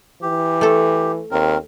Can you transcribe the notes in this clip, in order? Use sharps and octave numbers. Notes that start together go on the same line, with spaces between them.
E3 G4
A3 A4
D#2 C4 A#4